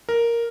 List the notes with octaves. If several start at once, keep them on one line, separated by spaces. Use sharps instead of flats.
A#4